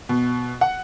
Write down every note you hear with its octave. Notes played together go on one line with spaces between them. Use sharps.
B2
F#5